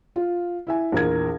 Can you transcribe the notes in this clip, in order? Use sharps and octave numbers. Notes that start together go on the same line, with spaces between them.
F4
E4 E5 G#5
A#1 E2 A#4 G#6